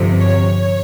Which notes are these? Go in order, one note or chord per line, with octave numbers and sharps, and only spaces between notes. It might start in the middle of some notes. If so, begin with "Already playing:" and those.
Already playing: G1 F2 C3 F3
C#5